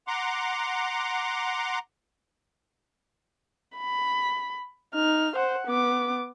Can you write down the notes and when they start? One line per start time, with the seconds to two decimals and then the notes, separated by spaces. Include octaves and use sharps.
0.08 F#5 A#5 C6 D6
3.77 B5
4.94 D#4 F6
5.36 C5 F#5
5.67 B3 D6